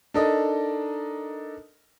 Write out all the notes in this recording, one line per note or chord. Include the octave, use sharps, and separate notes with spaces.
D4 D#4 A4 A#4 D#5